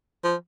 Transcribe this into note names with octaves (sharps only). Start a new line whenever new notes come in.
F3